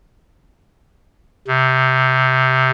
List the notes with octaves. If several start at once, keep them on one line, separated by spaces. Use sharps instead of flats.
C3